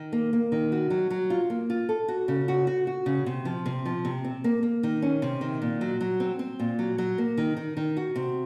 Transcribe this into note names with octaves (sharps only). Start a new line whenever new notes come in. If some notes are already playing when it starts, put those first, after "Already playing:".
Already playing: D#3
A#3
A#3
D#3
F#4
F#3
F#3
F4
A#3
F4
A4
F#4
C#3
F#4
F#4
F#4
C#3
C3
F3
C3
F3
C3
C4
A#3
A#3
D#3
C#4
C3
D#3
A#2
F#3
F#3
C4
C4
A#2
F#3
F#3
A#3
D#3
D#3
D#3
F#4
C3